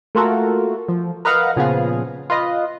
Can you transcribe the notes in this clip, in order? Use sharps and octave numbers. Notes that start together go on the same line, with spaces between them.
A3 A#3 F4 F#4 A4 A#4
F3
A#4 B4 D#5 F5 F#5 A#5
A#2 C#3 F3 B3 F4 G#4
F4 B4 D#5